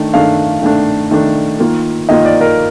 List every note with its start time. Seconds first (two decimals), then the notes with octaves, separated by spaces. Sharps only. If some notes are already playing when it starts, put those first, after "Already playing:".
Already playing: D#3 A3 D4
0.14 D#3 A3 D4 F5
0.62 D#3 A3 D4
1.11 D#3 A3 D4
1.59 D#3 A#3 F4
2.08 D#3 A#3 F4 D#5
2.25 D5
2.41 A#4